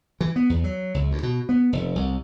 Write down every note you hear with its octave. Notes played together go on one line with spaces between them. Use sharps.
E3
B3
E2
F#3
C#2
D2
B2
B3
F1
C2